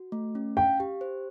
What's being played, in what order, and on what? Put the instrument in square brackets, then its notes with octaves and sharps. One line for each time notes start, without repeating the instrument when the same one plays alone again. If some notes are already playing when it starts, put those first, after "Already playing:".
Already playing: [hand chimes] F#4
A3
C#4
[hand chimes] F5 [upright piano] G5
[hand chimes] G4
C5